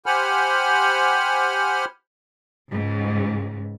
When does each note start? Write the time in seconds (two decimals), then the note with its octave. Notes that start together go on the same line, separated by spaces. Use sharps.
0.06 G4 C5 F#5 G#5 B5 F6
2.70 C#2 G#2